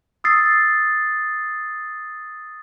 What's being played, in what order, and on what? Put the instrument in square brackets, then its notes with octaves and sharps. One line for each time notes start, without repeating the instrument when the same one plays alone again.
[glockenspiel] D#6 E6 A6 C7